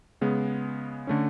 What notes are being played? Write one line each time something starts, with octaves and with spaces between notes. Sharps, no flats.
C#3 G#3 B3
D3 A3 C#4